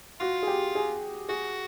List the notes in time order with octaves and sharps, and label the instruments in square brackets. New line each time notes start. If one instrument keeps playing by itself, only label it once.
[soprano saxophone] F4 [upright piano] F#4
[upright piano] G#4
G4
G#4
[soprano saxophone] F#4 [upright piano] G#4